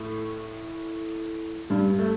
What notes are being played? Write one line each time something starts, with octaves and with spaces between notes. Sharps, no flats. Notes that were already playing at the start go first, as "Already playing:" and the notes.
Already playing: A2 A3
G2 G3
A3